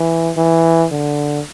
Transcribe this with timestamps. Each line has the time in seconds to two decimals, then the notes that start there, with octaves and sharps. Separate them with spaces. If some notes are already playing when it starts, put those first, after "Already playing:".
Already playing: E3
0.37 E3
0.91 D3